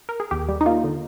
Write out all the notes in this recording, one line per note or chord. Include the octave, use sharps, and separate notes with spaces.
A#4
G#4
D#2 G4
G3
D#4
A#3 F4
D3